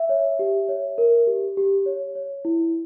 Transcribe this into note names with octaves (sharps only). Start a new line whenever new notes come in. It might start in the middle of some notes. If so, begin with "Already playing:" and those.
Already playing: E5
C#5
G4
C#5
A#4
G4
G4
C#5
C#5
E4